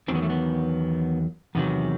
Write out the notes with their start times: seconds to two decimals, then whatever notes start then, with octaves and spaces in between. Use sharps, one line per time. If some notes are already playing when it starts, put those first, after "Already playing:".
0.08 E2 D#3 F#3 C4
0.15 B3
0.22 A3
0.30 B3
1.55 E2 C3 D#3 F#3 B3